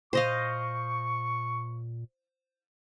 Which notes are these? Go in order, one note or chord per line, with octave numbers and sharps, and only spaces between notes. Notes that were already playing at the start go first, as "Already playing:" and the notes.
A#2 C5 D#5 F5 C#6